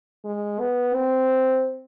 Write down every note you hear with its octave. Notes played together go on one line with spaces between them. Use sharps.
G#3
B3
C4